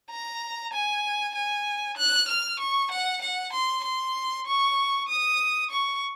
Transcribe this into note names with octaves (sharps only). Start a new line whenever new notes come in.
A#5
G#5
G#5
F#6
F6
C#6
F#5
F#5
C6
C6
C#6
D#6
C#6